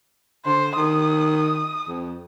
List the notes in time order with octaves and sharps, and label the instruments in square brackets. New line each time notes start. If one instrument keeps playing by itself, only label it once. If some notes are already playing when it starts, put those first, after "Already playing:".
[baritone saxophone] D3 [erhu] C5
[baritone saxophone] D#3 [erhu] D#6
[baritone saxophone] F2